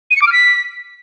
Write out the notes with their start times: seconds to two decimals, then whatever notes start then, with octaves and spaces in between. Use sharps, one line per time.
0.11 D#7
0.16 C#7
0.21 D6
0.27 F6
0.32 B6